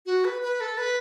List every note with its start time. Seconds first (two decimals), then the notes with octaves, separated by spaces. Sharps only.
0.06 F#4
0.25 B4
0.42 B4
0.60 A4
0.78 B4